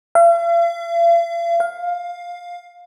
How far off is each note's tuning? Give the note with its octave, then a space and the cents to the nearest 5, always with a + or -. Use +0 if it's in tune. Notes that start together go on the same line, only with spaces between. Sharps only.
F5 -45
F5 +15